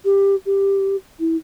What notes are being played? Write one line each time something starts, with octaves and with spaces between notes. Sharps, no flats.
G4
G4
E4